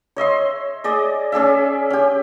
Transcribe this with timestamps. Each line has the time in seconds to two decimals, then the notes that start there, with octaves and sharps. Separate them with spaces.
0.16 C#5 D#5 E5 C6
0.84 G#4 D5 D#5
1.32 C#4 G#4 D5 E5
1.90 C#4 G4